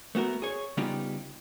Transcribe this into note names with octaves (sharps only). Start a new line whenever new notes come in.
A3 B3 F#4 A#4
G#4 C#5
C#3 G3 B3 D#4 F4 G4